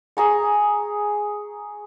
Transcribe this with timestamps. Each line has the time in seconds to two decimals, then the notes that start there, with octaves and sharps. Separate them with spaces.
0.17 G#4 A#5 C#6